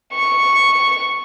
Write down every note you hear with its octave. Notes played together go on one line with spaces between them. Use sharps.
C#6